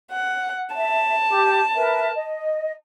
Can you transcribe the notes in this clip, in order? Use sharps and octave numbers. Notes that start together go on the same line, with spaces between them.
F#5
E5 A5
G4
A#4 B4 E5
D#5